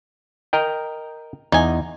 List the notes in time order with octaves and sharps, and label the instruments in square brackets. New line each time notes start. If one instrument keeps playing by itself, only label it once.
[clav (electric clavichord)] A#4 D#5 G5
[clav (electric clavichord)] E2 [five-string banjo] D#4 G#5